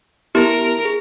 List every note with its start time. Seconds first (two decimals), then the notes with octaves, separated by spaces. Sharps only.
0.35 B3 E4 G4 A#4
0.85 G#4